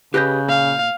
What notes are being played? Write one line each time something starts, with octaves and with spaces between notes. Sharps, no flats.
C#3 G4 B4 D#5 F#6 G6
A#2 F5